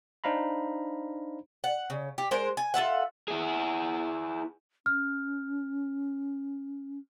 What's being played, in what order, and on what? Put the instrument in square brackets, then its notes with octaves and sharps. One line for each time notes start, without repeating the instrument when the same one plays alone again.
[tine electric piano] D4 D#4 C5 F5 A#5 B5
[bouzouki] F#5
C#3
G4
G#3 A#4 C5
G#5
F4 A4 E5 F#5
[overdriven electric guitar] E4 G#4
[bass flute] C#4 [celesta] F6